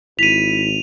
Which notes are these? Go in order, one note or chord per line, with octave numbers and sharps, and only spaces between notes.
G#1 E4 B6 D#7 F7